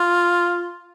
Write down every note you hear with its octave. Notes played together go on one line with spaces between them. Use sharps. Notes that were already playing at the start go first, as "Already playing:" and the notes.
Already playing: F4